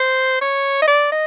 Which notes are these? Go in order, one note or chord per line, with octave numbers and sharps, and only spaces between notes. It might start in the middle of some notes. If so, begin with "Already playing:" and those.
Already playing: C5
C#5
D#5
D5
D#5